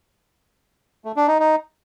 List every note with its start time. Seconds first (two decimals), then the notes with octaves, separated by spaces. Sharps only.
1.05 A3
1.16 D4
1.28 D#4
1.39 D#4